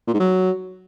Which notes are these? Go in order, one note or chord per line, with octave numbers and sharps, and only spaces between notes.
A#2
G#2
F#3